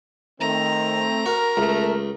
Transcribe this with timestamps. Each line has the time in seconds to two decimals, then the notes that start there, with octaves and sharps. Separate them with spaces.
0.40 D#3 A3 C4 A#5
1.26 F#4 A#4
1.57 C#2 A3